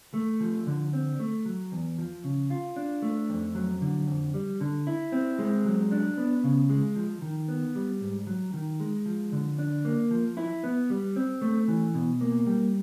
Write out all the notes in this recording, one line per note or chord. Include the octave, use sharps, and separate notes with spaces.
A3
F3
D3
C4
A3
F#3
E2
F3
C#3
F4
D4
A3
F2
F#3
D3
F2
G3
D3
E4
C4
G#3
F#3
D4
B3
C#3
G#3
F3
D#3
B3
G3
G#2
F#3
D#3
G#3
F3
D3
D4
A#3
F3
E4
B3
G3
C4
A3
E3
B2
A#3
G3